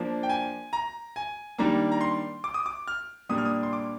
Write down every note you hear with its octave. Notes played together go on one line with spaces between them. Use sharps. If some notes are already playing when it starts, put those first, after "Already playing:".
Already playing: F3 A#3 D4
G5
G#5
A#5
G#5
D#3 G3 A#3 D4 A#5
A#5
C6
D6
D#6
D6
F6
A#2 G3 A#3 D4 D#6
F6
D#6
C6
D6